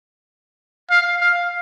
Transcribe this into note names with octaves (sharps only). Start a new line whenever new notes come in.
F5
F5